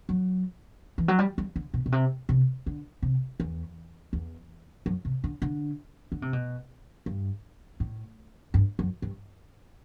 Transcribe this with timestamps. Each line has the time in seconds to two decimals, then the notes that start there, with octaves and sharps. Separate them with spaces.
0.09 F#3
0.98 E3
1.08 F#3
1.19 G3
1.38 G3
1.56 D3
1.74 B2
1.86 B2
1.92 C3
2.29 C3
2.66 D3
3.02 C3
3.40 E2
4.13 E2
4.86 F#2
5.05 C3
5.24 D3
5.42 D3
6.12 D3
6.22 C3
6.33 B2
7.06 G2
7.80 A2
8.54 G2
8.79 F#2
9.02 G2